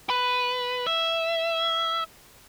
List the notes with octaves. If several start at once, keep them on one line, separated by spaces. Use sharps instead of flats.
B4
E5